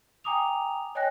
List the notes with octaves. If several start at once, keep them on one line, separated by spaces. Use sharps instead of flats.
G5 G#5 A#5 D6 D#6 F7
C#5 D#5 G5 G#5 F#6 A#6